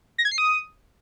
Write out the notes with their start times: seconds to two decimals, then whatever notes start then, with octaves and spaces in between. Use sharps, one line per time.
0.18 A#6
0.25 G#6
0.31 C7
0.38 D#6